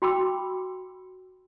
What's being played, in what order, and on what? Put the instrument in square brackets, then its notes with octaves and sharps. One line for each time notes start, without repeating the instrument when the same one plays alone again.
[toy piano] F#4 G5 B5 C6 D6 E6